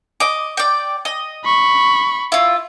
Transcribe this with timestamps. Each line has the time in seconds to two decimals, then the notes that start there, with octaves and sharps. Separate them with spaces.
0.20 D#5 D6
0.57 D5 G5
1.05 D#5
1.44 B5 C#6
2.32 E4 F4